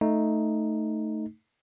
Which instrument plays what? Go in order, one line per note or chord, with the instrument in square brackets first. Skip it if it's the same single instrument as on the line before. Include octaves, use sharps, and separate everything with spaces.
[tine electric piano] A3 D#4